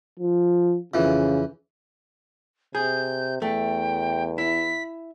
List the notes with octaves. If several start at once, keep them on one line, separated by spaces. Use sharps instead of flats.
F3
F2 C#3 E3
C3 G#4 G6
E2 A3 G5
E4 B6